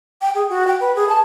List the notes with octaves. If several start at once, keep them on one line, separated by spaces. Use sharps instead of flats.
G5
G#4
F#4
G5
B4
G#4
A5